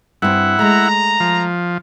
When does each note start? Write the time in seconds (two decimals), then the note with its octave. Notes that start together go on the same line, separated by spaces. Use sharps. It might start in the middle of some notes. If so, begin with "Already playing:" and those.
0.22 G2 C4 E4 F#5
0.59 G#3 A3 A#5
1.20 F3